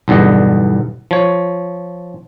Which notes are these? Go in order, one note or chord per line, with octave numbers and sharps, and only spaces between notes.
B1 E2 G2 D3 D#5
F3 C#5